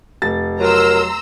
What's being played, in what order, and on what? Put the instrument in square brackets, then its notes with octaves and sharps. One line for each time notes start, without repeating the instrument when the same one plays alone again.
[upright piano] F1 A6
[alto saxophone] F#3 [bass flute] A#4 [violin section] A#5 C6 E6